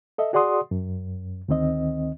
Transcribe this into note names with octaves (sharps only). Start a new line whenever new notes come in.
A4 D#5 E5
F#4 G#4 D5 F#5 C6 D#6
F#2
D2 D#3 C4 D#5